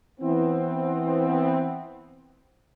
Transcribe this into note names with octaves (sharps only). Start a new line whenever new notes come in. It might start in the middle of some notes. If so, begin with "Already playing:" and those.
E3 B3 C4